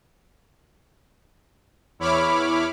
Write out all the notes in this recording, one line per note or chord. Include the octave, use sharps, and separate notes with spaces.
E2 E4 C#5 B5 D6 F6